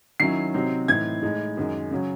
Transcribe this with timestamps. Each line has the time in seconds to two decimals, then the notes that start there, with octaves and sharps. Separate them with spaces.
0.20 D#3 F#3 C#4 E4 C7
0.54 C3 F#3 C4 D#4
0.88 A2 E3 C4 D#4 G#6
1.22 A2 G#3 D#4
1.57 F#2 D#3 G#3
1.91 C#3 F#3 C#4